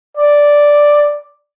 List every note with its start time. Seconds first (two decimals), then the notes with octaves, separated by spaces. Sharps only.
0.17 D5